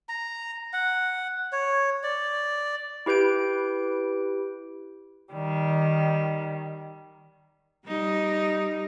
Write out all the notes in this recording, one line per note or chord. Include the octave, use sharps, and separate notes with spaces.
A#5
F#5
C#5
D5
E4 G4 B4 G6 D7
D#3 G3
G3 D#4